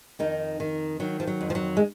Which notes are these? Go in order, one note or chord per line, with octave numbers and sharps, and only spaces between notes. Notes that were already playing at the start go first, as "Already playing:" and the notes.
F2 D#3 D#4
D#3
D#3 F#3
F3
F#3
F2
F3
F#3
G#3